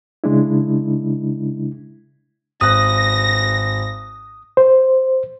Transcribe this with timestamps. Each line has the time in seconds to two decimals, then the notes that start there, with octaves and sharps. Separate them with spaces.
0.24 C#3 G#3 D4 E4
2.61 G#1 D#6 F#6 A#6
4.57 C5